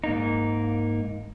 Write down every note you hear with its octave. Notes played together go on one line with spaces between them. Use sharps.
G#2 A#3 D#4